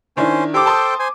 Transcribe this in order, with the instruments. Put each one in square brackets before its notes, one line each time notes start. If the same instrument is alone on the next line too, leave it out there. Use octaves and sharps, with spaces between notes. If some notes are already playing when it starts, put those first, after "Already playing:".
[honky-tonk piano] D#3 D4 E4 [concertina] C#4 C5
[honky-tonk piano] G4 D6 [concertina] A4 C5 G5
[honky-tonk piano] A5 C6 D#6
[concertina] C5 G#5